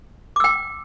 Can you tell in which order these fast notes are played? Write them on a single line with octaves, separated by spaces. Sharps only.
D6 E6 G5